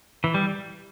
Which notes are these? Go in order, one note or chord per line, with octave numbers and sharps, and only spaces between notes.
E3
G3